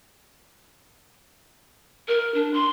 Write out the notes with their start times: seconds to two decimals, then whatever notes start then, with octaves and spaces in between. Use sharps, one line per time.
2.08 A#4
2.34 D4
2.54 C6